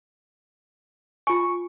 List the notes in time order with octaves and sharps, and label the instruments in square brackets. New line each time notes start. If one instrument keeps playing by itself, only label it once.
[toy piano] F4 G#5 [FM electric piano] C#6